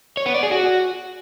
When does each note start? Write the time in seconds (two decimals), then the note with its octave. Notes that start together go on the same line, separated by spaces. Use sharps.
0.17 C#5
0.26 B3
0.34 D5
0.43 G#4
0.51 F#4